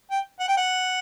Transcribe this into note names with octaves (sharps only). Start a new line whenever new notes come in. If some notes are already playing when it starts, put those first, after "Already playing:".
G5
F#5
G5
F#5